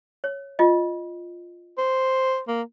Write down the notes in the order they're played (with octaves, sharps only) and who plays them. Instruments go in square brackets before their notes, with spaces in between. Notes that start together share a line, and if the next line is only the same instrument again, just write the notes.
[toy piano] C#5
F4 D#5
[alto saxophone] C5
A#3